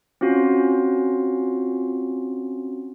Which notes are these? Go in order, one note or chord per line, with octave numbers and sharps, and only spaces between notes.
C4 C#4 F4 F#4